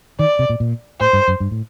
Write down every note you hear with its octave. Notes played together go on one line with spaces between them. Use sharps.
D#3 D5
C3
A#2
A#2
A2 C5
G2
F#2
G2
A2